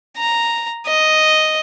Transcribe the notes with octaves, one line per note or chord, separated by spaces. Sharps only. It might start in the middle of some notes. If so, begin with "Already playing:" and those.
A#5
D#5